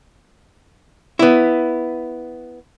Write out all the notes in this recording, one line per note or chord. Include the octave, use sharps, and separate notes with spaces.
B3 E4